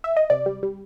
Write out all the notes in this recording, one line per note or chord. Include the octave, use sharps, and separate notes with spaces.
E5
D#5
C3 D5
G3
G3